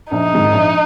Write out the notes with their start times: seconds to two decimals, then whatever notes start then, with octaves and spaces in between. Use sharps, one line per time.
0.12 A#1 D#4
0.33 G#2 D#3 G#3 C4
0.53 A#1